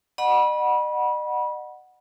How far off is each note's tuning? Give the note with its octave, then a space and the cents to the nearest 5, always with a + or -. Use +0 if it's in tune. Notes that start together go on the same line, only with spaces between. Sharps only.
D#5 -40 F#5 +0 B5 -25